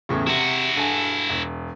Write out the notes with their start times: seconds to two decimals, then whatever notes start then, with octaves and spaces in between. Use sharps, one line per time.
0.09 E2 A2 C#3
0.27 C3 E4 F#4
0.76 G2 A4 G#5
1.30 E1